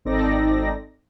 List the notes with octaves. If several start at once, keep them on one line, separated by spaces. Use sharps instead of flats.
G#1 C4 D#4 A4 D5 A#6